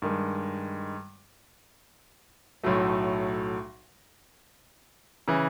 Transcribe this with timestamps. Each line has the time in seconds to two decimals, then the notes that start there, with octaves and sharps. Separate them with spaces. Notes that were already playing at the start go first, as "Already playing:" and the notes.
0.02 G2 D#3 G#3
2.63 B1 A2 F#3 A3
5.28 C#3 E3